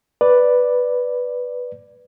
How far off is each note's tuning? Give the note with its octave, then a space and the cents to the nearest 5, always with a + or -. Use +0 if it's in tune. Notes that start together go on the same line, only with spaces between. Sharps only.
B4 +0 D5 +0